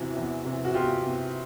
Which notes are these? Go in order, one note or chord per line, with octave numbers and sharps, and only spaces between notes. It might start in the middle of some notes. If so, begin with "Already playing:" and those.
Already playing: E2 C3 E3 F#4
E2
C3 E3
F#4
E2 F4 G4
C3 E3